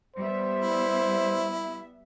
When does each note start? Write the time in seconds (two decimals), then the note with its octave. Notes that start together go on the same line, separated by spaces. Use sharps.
0.16 G3 B3 C5 E5
0.60 E4